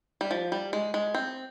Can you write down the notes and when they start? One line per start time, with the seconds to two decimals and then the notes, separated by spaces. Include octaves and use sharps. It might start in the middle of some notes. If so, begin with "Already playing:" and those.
0.21 G3
0.31 F3
0.52 G3
0.73 G#3
0.94 G#3
1.14 C4